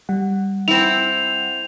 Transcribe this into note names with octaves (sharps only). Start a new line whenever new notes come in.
G3 F#5
C4 E4 F7